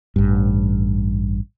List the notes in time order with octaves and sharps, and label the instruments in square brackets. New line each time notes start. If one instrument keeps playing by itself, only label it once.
[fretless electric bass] A1 G2